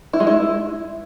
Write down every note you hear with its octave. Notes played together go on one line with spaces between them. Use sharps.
E4
G#3
E4